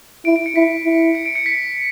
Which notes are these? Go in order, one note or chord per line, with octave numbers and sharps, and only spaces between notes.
E4 D7
D7
C#7
E4 B6
E4
C#7
D7
C#7
B6